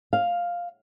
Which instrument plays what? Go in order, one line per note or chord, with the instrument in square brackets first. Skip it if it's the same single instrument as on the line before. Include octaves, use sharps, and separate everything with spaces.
[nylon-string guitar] F5